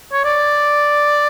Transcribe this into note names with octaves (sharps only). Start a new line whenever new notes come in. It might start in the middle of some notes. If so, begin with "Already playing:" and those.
C#5
D5